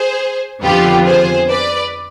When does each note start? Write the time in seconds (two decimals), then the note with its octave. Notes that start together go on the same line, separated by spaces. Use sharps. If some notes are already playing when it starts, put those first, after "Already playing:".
Already playing: G#4 C5
0.62 F2 D3 F3 B3 F4 G4 B4
1.06 G#4 C5
1.48 B4 D5